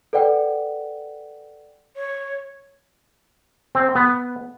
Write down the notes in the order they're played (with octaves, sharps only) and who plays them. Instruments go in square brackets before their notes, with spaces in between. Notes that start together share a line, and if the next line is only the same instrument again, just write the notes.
[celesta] A4 B4 D5 F#5 G5
[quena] C#5
[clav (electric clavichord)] C4
B3